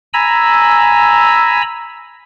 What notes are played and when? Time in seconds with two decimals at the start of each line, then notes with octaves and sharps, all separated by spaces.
0.14 G#5 A#5 B5 E6